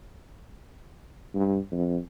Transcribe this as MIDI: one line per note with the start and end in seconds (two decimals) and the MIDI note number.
1.35 1.58 43
1.72 1.98 41